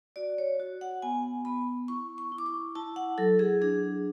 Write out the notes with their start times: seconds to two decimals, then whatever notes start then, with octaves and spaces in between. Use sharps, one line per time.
0.16 F#4 D5
0.38 C#5
0.60 F#4
0.81 F#5
1.02 B3 G#5
1.45 B3 B5
1.88 E4 C#6
2.18 C#6
2.32 E4
2.38 D6
2.46 C#6
2.75 E4 A5
2.96 F#5
3.18 F#3 A4
3.39 G#4
3.61 D4 G#4